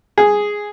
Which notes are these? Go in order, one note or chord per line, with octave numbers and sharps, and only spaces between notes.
G#4